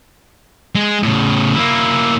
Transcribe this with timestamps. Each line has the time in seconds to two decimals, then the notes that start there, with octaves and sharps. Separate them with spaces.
0.75 G#3
1.03 A2 C#3
1.56 A#3 E4